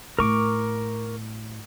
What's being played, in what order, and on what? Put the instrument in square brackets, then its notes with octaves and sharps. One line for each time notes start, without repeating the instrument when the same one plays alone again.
[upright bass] A2 [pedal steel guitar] A#4 C#6 D6